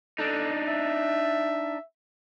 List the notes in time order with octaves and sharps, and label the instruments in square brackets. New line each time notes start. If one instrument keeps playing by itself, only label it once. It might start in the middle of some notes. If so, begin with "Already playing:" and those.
[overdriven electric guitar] D4 D#4 [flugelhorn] A4
[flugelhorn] E5